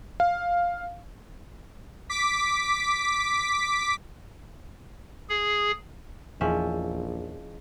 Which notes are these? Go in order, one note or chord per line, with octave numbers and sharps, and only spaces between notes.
F5
D6 B6
G#4
A#1 E2 F3 C#4 E4 G#4 D#5 E5